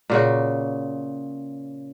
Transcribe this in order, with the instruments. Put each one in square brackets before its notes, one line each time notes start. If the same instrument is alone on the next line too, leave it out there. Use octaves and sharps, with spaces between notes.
[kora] A#2 C#3 F#4